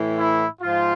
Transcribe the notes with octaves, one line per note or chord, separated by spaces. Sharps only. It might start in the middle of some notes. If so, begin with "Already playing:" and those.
Already playing: A2 E3
E4
G#2 F3 F4